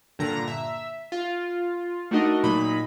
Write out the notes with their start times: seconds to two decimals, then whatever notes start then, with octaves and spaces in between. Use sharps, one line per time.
0.19 G2 A#2 D3 A#5
0.47 E5
1.12 F4
2.11 A3 D4 D#4 F#4 A#4 D#5
2.43 A#2 F#3 D#4 B5